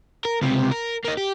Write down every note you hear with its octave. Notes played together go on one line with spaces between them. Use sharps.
A#4
C#2 C3
A#4
A#3 D#4
G4